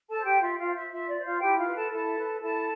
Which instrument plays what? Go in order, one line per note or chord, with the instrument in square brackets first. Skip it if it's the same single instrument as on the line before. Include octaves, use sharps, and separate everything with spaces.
[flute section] A4 A5
C5
G4 G5
F4 E5
F4 F5
C5
E5
F4 E5
D5
C5
F4 F5
E4 G4 G5
F4 F5
B4
A4 A5
E4 A4 A5
B4
E4 A4 A5